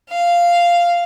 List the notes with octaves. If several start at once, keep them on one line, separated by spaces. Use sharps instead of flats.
F5